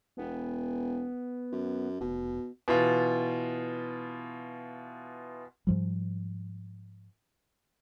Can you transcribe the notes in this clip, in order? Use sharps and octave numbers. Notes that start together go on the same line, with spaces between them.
E1 B3
F#2
F1 B2
B2 E3 F4
G#2 F3 G3